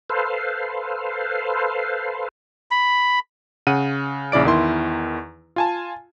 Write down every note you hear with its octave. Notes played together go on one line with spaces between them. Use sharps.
A4 B4 C5 F5
B5
C#3 F#5 D#7
A#1 C#3 E4 D5 D7
E2 D#3 E4 C6
F4 G#5 A5